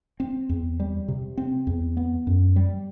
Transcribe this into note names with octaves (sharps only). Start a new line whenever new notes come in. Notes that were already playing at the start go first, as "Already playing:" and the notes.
C4
E2
G3
C3
C4
E2
B3
F#2
G3